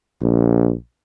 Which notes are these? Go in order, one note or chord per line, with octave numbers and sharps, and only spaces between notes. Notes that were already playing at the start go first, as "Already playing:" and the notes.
A#1